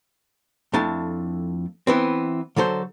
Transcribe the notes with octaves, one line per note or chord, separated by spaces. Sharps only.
F2 A3 D4 E4 A5
E3 B3 C4
D3 F#3 A4 C5